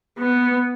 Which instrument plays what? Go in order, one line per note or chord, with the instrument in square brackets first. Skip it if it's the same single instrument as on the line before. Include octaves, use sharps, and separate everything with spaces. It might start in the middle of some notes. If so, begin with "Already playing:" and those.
[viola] B3